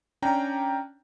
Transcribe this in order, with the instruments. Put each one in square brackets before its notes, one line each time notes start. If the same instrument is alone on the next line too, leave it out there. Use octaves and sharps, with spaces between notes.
[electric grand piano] C#4 D4 G5 A#5